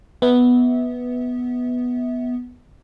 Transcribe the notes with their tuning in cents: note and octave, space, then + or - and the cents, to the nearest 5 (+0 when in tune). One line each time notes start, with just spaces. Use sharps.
B3 +0 E5 -25